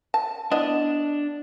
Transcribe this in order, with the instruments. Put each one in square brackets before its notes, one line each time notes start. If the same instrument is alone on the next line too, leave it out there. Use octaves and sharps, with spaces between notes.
[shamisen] A5
[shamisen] B3 E4 D#5 [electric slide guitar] D4